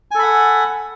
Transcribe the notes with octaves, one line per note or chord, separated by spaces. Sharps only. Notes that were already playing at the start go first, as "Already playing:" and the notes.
A4 F#5 G#5 B5